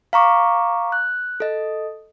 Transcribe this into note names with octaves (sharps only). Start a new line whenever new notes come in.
F5 A#5 C#6 D6
F#6
A4 D#5